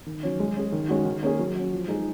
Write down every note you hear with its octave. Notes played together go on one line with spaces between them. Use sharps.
D#3
F#3 C#4
G#3
C#4 G#4
D#3
G#3 C#4 F#4
D#3
A#3 C#4 G#4
F#3
C#4 F#4
F3
G#3 D#4 G#4